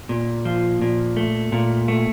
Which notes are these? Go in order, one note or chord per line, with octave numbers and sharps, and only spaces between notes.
A#2
F3
A#2
A3
A#2
A3